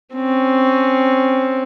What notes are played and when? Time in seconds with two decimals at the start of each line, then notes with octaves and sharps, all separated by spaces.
0.15 C4 C#4